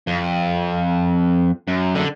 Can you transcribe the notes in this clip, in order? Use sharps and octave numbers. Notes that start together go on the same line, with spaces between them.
F2
F#2
D3